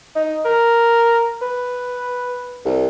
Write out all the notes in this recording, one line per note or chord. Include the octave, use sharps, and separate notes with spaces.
D#4
A#4
B4
C2